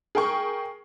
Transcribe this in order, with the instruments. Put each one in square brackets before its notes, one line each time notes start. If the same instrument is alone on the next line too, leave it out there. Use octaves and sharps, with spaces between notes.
[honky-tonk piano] G#4 A#4 G5 C#6